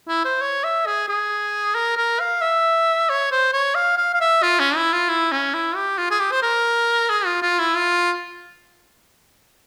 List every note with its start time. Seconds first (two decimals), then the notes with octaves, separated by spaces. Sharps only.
0.08 E4
0.25 C5
0.41 C#5
0.64 E5
0.86 G#4
1.09 G#4
1.75 A#4
1.97 A#4
2.20 F5
2.41 E5
3.09 C#5
3.32 C5
3.53 C#5
3.75 F5
3.98 F5
4.14 F5
4.21 E5
4.43 F4
4.59 C#4
4.76 E4
4.93 F4
5.09 E4
5.32 C#4
5.54 E4
5.76 G4
5.98 F4
6.11 G#4
6.20 G4
6.32 C5
6.42 A#4
7.10 G#4
7.25 F4
7.42 F4
7.59 E4
7.76 F4